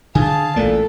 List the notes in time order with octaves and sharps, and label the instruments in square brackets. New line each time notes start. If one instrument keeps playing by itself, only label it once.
[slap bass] D3 [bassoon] G#4 [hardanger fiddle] F5 A5
[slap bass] A1 A3 A#3 [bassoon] A#2 [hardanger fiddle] A4